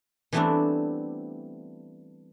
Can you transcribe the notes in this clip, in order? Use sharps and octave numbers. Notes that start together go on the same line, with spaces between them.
E3 G3 A3 B3 C4 D4